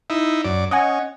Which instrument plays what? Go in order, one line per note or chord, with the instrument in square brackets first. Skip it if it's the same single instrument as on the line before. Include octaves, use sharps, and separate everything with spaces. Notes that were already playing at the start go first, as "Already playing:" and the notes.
[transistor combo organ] D#4 E4
F#2 D5
[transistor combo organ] C#4 [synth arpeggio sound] D#5 F#5 G#5